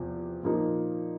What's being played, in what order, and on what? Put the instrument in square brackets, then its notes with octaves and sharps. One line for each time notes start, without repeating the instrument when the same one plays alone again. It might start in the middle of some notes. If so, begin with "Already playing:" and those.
Already playing: [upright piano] E2 C3 F3
A#2 F3 A#3 D#4